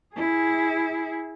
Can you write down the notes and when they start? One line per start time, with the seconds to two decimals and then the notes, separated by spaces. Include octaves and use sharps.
0.15 E4 G#4